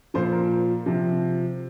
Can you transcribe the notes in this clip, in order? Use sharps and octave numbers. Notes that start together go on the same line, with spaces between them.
A#2 F3 C5
A#4
C3 F3